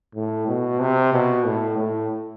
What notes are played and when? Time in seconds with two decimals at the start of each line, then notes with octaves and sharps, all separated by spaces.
0.15 A2
0.48 B2
0.80 C3
1.13 B2
1.45 A2
1.77 A2